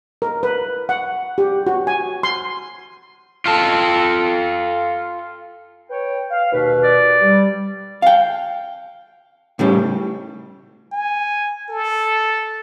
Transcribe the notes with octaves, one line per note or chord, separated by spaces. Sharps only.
A#4
B4
F#5
G4
F#4
G#5
C6
F4 A4
B4 C#5 G5
F5
D#2 B2 B4
D5
G3
F5 G5
A2 C#3 G3
G#5
A4